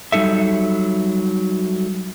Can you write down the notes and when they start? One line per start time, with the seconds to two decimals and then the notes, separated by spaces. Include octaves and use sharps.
0.12 F#3 G3 D#4 A4 E5